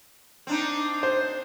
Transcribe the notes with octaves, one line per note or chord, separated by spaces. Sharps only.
C4 D4 D#4
C5